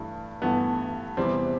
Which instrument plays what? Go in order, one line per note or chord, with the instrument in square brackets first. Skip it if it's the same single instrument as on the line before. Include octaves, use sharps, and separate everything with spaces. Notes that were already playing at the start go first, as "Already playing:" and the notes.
Already playing: [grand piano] G2 E3 A3
G2 E3 A3 B3
E2 C3 E3 G3 C4